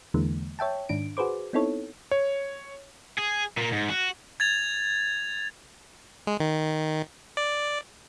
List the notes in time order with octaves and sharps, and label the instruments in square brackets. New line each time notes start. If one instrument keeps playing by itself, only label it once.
[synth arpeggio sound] E2 D3 E3 G#3 A#3
C#5 E5 G5 A5
G#2 D#3 D4 D7
F#4 G#4 B4 C5 D6
B3 C4 D#4 E4 A4 C#5
[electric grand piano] C#5
[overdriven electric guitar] G#4
A#2 A#3
G#2
F#4
[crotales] G#6 A6 F7
[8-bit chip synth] G#3
D#3
D5